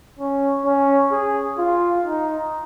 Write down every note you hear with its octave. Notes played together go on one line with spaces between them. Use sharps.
C#4
C#4
G#4
F4
D#4